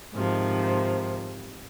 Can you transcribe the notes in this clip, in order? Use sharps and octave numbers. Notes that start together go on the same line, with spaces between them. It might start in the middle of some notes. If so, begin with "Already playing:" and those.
G#2 C3 D#3 F3